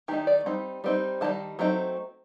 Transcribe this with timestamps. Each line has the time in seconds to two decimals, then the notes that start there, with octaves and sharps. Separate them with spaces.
0.08 D#3 A3 D#4 G4
0.27 D5
0.46 G3 C4 D#4
0.84 G3 C4 D#4
1.21 D#3 G3 D#4 A5
1.59 F#3 A3 C4 D#4